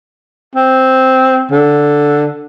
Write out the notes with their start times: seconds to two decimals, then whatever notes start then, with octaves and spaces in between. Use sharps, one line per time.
0.55 C4
1.51 D3